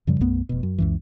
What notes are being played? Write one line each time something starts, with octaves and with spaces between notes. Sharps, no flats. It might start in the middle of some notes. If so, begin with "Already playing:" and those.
F#2 C#3 F3 G3
B1 F#2 A3 B3
F1 B2
F#2
C#2 F#2 E3